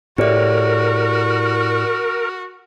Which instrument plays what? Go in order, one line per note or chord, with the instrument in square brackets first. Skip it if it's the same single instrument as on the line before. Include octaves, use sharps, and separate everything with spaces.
[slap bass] A2 [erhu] F#4 [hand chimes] G4 D5 [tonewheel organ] A#4